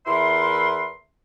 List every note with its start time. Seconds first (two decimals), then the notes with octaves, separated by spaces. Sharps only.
0.06 E2 E4 A#4 B4 E5 C6